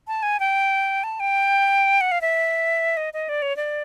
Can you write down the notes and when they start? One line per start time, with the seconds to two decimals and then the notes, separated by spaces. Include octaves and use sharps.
0.08 A5
0.23 G#5
0.40 G5
1.04 A5
1.20 G5
2.01 F#5
2.12 F5
2.21 E5
2.97 D#5
3.14 D#5
3.29 D5
3.42 C#5
3.57 D5